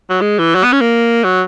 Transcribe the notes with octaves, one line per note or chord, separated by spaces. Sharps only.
F#3
G#3
E3
F#3
B3
C#4
A#3
F#3